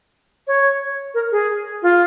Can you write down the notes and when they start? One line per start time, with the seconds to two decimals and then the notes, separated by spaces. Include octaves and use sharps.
0.47 C#5
1.14 A#4
1.32 G#4
1.83 F4